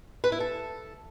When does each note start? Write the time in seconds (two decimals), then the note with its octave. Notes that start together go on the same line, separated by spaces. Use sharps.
0.24 B4
0.32 E4
0.40 A4